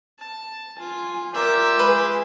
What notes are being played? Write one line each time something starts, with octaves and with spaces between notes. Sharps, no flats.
A5
F4 G#5
F4 G4 A#4 D5 E5
G#3 G#4 B4